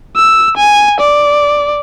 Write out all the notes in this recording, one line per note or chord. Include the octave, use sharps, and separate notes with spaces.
E6
G#5
D5